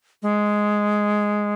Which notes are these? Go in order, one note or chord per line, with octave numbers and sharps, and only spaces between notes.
G#3